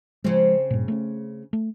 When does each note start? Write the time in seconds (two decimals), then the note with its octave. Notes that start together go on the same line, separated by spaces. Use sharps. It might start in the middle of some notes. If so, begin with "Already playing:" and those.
0.25 C#3 F3 G#3 C4
0.71 G2 A#2
0.88 A3 B3 C#4
1.53 A3